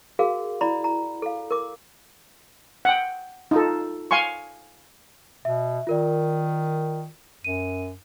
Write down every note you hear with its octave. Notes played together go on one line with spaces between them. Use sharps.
F#4 G#4 A#4 F5
E4 D5 A#5 B5
A#5
A4 F5
A#4 D6
F#5 G5
D#4 F4 A4
F5 G#5 C6 C#6
B2 E5
D#3 F4 A#4 D5
F#2 D#7